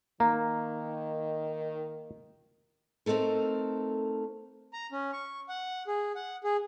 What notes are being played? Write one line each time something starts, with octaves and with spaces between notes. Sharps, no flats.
D#3 A#3 A#5
A3 C4 D#4 A4 A#4
A#5
C#4
C#6
F#5
G#4
F#5
G#4